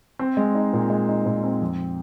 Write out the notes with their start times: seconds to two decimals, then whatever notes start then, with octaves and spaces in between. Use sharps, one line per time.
0.19 C4
0.37 G#3
0.55 D#4
0.73 A#2
0.90 G#3
1.09 D#4
1.25 A#2
1.43 C4
1.61 F2